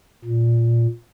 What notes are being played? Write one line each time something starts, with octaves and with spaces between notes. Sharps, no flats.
A#2